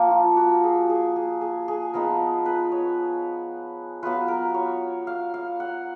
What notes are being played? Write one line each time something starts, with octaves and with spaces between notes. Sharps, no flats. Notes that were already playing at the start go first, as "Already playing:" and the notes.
Already playing: F3 A#3
F4
F#4
G#4
G#4
G#4
G#4
G#4
F3 B3 D#4 A#4
B4
C#5
F#3 B3 F4 B4
A#4
C#5
F5
F5
F#5